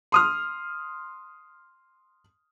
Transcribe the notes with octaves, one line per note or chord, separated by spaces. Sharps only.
C6 D#6 F6